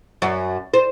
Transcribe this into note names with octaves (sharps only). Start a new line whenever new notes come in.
F#2
C5